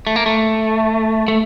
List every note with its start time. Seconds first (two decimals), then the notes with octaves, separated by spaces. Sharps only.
0.07 A3
0.16 A#3
0.26 A3
1.28 A3